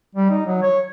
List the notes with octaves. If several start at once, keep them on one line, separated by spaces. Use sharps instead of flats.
G3
D#4
F#3
C#5